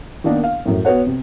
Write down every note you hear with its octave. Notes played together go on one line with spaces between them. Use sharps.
D#3 A#3 B3 D4 D#4
F5
F#2 A2
B3 F#4 B4 C#5 F#5
C3